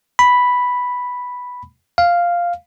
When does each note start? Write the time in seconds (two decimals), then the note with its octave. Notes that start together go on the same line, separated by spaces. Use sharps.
0.19 B5
1.98 F5